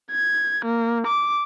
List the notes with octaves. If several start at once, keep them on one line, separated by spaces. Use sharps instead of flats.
G#6
A#3
D6